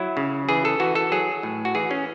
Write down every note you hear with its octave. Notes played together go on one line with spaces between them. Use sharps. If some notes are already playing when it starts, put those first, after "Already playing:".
Already playing: F#3 E4
C#3
E3 G#4
A4
E3 F#4
A4
F#3 G#4
A2
F#4
E3 G#4
C#4